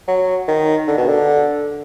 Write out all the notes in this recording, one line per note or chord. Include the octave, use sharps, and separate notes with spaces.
F#3
D#3
D3
B2
D3